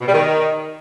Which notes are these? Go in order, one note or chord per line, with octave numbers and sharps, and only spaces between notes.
B2
G3
D#3